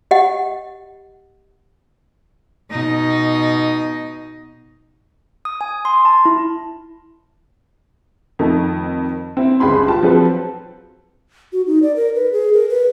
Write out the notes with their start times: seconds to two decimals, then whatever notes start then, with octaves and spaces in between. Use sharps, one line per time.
0.11 G4 D#5 F#5
2.71 B2 D#4
5.45 D#6
5.61 G#5
5.85 C6
6.05 A5
6.25 E4
8.39 F2 D#3 A3
9.37 C4 E4
9.60 G1 C#2 G#4 B5 C6
9.88 F4 G4 A5
10.02 F3 F#3 C4 A4 B4 C5
11.53 F#4
11.67 D#4
11.83 D5
11.96 A#4
12.15 B4
12.33 G#4
12.53 A#4
12.69 B4